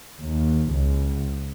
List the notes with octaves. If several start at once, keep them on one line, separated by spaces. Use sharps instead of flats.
D#2
C#2